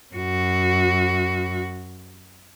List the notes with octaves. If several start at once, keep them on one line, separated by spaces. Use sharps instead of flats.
F#2 F#4